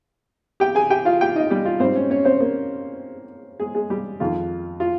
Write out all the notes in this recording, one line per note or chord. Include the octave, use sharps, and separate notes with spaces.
G4 G5
G#4 G#5
G4 G5
F4 F5
G4 G5
D#4 D#5
G3 G4
F4
G#2 G3 C4 C5
C#4 C#5
C#4 C#5
C4 C5
A#3 A#4
G#3 G#4
G#3 G#4
G3 G4
F2 D#3 G#3 F4
F4